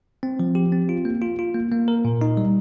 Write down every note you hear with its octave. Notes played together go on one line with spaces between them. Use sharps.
C4
F3
G4
C4
F4
A#3
F4
F4
A#3
A#3
A#4
A#2
D#4
G3